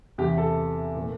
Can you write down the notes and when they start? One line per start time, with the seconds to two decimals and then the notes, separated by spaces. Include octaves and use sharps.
0.18 E2 C3 E3 G4
0.38 A4
0.96 A#2 A3 C4